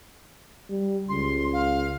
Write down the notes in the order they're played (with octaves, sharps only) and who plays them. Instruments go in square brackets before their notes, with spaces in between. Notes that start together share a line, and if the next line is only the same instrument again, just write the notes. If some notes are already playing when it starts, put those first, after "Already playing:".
[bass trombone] G3
[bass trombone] C#2 [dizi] C6
[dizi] F5